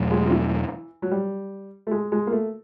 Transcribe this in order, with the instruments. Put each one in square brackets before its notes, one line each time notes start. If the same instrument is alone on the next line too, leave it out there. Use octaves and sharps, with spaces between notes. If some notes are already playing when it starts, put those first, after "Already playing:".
Already playing: [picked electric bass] E2 B2 F#3 A3
[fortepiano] G#3
F3
E3
F#3
G3
A3
G#3
G#3
A#3
A3